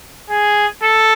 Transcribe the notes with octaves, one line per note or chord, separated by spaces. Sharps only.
G#4
A4